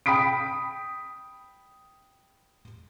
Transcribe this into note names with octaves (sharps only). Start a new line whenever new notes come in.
G5 B5 D#6 B6 D7